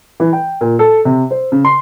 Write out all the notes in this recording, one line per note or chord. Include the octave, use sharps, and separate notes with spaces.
E3
G5
A#2
A4
C3
C5
C#3
C6